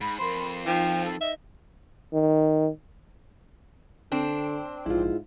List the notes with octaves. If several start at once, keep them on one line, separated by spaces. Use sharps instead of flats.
G#2 B5
F2 A#4 C5 B5 C6
F3 D#4 G5
A4
D#5 E5
D#3
D3 C4 D4
A#1 G#2 E4 F4